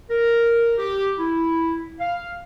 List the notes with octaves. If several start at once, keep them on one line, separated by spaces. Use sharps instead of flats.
A#4
G4
E4
F5